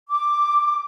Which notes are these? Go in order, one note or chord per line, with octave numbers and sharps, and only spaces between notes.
D6